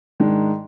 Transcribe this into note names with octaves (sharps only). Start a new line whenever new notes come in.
G#2 D#3 G#3 D4